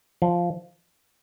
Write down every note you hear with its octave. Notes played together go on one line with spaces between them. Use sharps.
F3